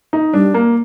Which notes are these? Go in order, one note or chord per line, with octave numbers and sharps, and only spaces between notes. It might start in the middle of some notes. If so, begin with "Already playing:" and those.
D#4
G3 D4
A#3